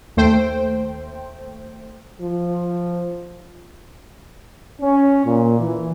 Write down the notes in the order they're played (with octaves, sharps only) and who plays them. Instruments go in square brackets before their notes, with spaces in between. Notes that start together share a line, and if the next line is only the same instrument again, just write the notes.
[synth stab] D#2 A3 C5 G5
[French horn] F3
[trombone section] C#4
A#2
E3